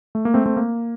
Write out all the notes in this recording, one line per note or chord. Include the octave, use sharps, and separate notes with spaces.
A3
A#3
A3 C4
A3 C4
A#3